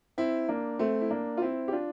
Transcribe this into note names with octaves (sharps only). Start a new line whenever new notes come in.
C4 E4
A#3 D4
A3 C4
E4
A#3 D4
F4
C4 E4
G4
D4 F4